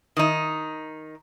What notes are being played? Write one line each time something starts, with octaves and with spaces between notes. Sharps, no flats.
D#3 D#4